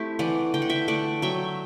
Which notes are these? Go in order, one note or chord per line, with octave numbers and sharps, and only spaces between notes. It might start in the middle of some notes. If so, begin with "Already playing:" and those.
Already playing: A3 C4 E4 G4
E3 D5 F#5
D3 G5
F#5
E5 G5
A3 D5 F#5
F#3 E5 G5